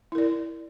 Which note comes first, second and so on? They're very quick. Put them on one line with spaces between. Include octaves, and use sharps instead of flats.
E4 A#4 D5